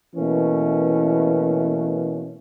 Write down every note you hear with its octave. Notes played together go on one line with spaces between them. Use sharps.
B2 E3 A3 A#3 C#4